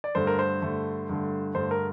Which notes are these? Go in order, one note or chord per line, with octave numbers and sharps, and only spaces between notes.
D5
G2 D3 A3 C5
A#4
C5
G2 D3 A3
G2 D3 A3
G2 D3 A3 C5
A#4